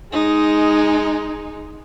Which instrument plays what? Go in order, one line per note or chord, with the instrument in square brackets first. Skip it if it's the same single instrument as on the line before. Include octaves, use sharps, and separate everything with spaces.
[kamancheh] G#3 D#4